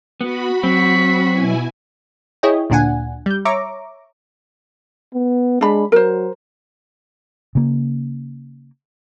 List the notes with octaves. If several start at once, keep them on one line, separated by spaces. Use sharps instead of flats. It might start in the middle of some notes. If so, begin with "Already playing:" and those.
B3 F#4 B5
F#3 C4 C#6 B6
B2 E4 G#5
E4 G#4 C#5 D#5 G5
D2 A#2 D4 F#5 G#5
G3 G6
C#5 E5 A#5 C#6 D6
B3
G#3 D4 B5
F#3 A#4 C5
C#3 A#3